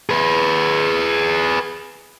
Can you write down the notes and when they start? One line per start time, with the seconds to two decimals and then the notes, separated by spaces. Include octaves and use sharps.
0.09 G#4 B4